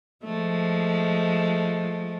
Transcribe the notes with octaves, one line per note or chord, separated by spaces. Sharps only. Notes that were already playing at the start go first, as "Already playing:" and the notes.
F3 G#3 A3